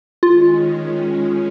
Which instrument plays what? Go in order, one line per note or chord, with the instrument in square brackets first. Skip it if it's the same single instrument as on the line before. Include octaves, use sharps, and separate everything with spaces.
[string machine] D#3 G#3 C#4 [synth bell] F4